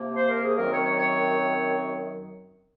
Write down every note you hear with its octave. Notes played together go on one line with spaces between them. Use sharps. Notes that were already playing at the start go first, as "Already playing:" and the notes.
Already playing: C3 F3 A#3
C5
A#4
G#4
F#2 D#3 F#3 C4 A#4
C#5
C#5
C#5